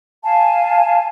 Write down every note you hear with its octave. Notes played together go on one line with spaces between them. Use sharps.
F5 G#5 A5